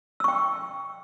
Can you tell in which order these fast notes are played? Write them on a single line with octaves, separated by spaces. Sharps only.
E6 C#6 G5